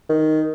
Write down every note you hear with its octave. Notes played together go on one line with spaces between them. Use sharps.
D#3